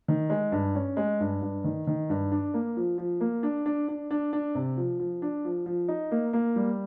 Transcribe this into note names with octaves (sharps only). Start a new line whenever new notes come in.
D#3
G#3
G2
C#4
G#3
G2
G2
D#3
D#3
G2
D4
A#3
F3
F3
A#3
D4
D4
D4
D4
D4
C3
F3
F3
D4
F3
F3
D#4
A#3
A#3
G3